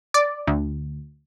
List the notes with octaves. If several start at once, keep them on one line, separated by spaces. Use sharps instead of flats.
D5
D2